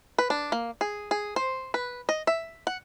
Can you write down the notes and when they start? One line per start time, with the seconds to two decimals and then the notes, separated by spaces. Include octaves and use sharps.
0.19 B4
0.30 D4
0.52 A#3
0.81 G#4
1.11 G#4
1.36 C5
1.74 B4
2.09 D#5
2.27 E5
2.67 F#5